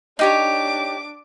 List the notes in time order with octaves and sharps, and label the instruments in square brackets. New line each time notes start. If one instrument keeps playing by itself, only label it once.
[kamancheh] D4 D6 [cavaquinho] D#4 G4 C#5